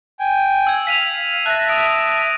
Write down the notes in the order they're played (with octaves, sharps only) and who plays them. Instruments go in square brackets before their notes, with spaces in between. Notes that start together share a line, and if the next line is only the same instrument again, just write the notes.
[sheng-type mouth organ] G5 G#5
[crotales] E6 G#6
[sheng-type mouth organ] F5 [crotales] B6 D#7 F7
[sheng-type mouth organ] E5 A5 E6 [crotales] F#6 A#6
[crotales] D#6 D7 D#7